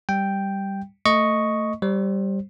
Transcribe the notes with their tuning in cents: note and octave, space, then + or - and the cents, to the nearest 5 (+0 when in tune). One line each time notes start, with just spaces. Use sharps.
G3 +0 G5 +0
A3 +20 D#5 +0 C#6 +0
G3 -5 C5 +25